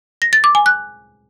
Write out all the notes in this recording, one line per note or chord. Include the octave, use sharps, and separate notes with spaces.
A#6
A6
D6
G#5
F#6